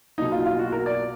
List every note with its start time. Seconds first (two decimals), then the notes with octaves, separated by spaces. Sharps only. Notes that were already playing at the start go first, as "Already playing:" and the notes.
0.18 B1 B2 A#3 D#4
0.32 F4
0.46 F4
0.59 F#4
0.72 A#4
0.86 D5